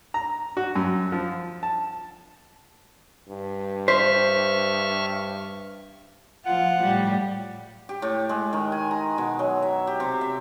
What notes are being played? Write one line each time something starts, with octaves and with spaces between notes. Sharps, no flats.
A#5
F#4
F#2
F3
A5
G2
C5 E5 C#6 F6 B6
F3 F4 F#5
A2 G3
G4
A2
G#3
D#3
G#5
A#5
B2
F#3
E5
G4
C3
E5